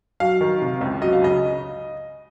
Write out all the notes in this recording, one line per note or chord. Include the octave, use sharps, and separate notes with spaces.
F#3 F5
D#3
C3
C#2
F#3 D#5
F5
C#3 D#5